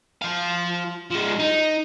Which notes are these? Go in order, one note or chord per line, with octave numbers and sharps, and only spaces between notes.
F3 F5
F3 G#3
D#4